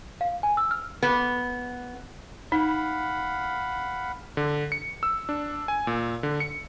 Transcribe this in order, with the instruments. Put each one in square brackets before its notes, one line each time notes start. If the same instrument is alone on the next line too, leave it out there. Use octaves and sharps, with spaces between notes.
[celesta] F5
G#5
E6
F6
[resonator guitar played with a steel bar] B3
[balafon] D#4 [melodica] F5 F#5 B5
[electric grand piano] D3
C#7
E6
D4
G#5
A#2
D3
C#7